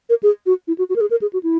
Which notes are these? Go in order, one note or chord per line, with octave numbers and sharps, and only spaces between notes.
A#4
G#4
F#4
E4
F#4
F#4
A#4
G#4
A#4
G#4
F#4
E4